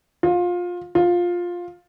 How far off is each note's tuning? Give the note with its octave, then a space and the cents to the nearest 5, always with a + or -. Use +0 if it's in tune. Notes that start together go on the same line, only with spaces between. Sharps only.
F4 +20
F4 +10